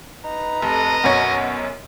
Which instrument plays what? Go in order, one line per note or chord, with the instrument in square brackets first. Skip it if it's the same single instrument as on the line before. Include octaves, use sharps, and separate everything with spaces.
[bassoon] D#4 [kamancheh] B4 A#5
[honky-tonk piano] F1 [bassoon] A4 [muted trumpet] D#5
[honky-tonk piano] B1 F#2 C#5 [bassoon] F#4